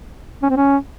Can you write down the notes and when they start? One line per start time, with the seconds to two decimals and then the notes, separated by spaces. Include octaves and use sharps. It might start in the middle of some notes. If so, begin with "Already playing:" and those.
0.43 C#4
0.50 C4
0.57 C#4